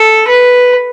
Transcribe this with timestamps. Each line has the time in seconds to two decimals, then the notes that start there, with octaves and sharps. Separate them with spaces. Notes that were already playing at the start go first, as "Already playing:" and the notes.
Already playing: A4
0.27 B4